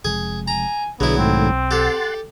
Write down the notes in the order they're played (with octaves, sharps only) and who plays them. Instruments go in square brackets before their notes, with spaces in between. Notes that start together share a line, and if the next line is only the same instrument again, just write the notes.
[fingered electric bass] F1 F2 G#3 [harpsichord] G#4
[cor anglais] G#5 [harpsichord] A#5
[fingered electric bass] B1 [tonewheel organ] D3 G#4 [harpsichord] F#3 E4 [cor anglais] B3
[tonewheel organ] G#2 D#3 A3 [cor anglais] C4
[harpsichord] G4 A4 [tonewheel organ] F#5 C6 A6